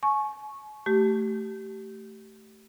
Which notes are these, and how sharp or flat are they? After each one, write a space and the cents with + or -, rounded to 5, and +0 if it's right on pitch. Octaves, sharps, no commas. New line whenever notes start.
G#5 +35 C#6 -10
A3 +0 G4 -20